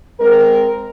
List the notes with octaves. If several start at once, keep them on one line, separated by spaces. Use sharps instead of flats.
G#3 C4 A#4